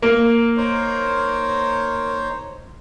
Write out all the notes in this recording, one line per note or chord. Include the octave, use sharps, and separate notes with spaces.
A#3
D#4 C5 C#5